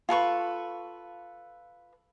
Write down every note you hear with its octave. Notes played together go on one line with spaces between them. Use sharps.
F4 A4 B4 C#6